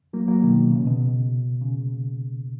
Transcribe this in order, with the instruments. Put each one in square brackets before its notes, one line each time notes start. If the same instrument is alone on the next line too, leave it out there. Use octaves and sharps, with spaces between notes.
[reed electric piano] F#3 A#3
F#3 A#3
B2 D#3
C#3
B2
C#3